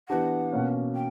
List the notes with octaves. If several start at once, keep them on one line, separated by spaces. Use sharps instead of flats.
E3 B3 D4 G4 F#5
B2 A#3 C#4
G5